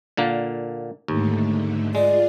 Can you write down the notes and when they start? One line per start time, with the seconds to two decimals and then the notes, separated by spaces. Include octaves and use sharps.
0.17 A#2 D3 A#3
1.08 D#2 G#2 D3 A3
1.95 G#3 F4 G#4 D5